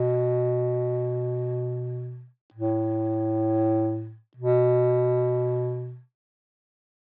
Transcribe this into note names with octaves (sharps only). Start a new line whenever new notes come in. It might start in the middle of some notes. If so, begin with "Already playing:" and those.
Already playing: B2
A2
B2